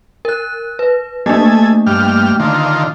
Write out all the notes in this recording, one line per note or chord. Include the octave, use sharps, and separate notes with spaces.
A#4 F#6
B4
A3 A#3 D4 A4 G#5
G2 G3 F6
D3 D#3 F4